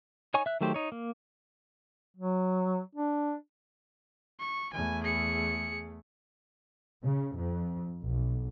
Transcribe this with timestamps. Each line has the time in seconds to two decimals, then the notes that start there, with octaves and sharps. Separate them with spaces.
0.34 D#4 C#5 G#5 C#6
0.46 E5 F#6
0.61 D#3 F#3 A3 G4 C5
0.74 D#4 C#5
0.92 A#3
2.17 F#3
2.95 D4
4.40 C#6
4.73 E2 A3 G#5
5.04 G#4 C#7
7.04 C#3
7.36 F2
8.01 B1